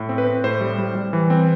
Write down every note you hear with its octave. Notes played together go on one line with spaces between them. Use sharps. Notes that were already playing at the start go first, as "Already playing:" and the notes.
Already playing: A2
C4
B4
C4
A2 C5
G3
G3
G3
E3
C4